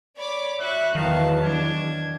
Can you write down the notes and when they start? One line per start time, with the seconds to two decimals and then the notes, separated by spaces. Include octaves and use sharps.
0.17 C#5 D5 B5 D6
0.60 F#4 E5 C#6 F#6
0.95 E2 D#3 E3 F#3 F5 A5
1.44 D4 G#6